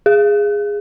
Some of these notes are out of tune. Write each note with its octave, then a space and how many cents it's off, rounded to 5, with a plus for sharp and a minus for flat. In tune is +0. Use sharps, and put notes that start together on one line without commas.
G#4 -10